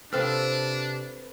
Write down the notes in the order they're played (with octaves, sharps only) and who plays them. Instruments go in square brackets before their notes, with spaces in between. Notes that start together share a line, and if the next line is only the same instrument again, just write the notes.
[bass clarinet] C3 [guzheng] C4 F4 A4 [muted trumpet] D4 [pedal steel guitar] B4 F6